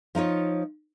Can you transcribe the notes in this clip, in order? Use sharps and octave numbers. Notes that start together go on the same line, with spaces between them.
F3 D#4 F4 C#5